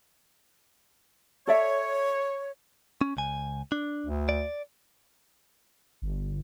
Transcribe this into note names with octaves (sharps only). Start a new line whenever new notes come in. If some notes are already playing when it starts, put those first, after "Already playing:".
A4 C#5 D5 E5
C#4
C#2 G#5
D4
D2
D5
G1